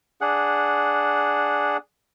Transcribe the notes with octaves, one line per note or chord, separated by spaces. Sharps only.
D4 G#4 F#5